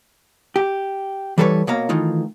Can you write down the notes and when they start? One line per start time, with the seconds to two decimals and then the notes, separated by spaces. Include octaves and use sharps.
0.56 G4
1.38 E3 G3 A4 B4 C#5
1.67 B2 A#3 C#5 F5 A#5
1.89 D#3 E3 A3 D#4 F4